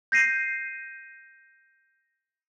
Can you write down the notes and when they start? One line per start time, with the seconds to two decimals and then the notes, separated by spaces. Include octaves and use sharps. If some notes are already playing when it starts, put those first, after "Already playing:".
0.12 G6 A#6 C7 D#7